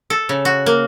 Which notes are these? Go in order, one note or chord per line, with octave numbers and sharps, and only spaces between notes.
A4
C#3
F#4
A#3